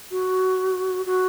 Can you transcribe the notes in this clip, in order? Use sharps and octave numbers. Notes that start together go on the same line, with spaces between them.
F#4
F#4